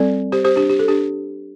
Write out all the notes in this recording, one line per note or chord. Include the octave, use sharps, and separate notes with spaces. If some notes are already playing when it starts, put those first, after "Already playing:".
Already playing: G3 C4 A4 D5
G4 C5
G4 C5
D4 G4
G4
A4
D4 G4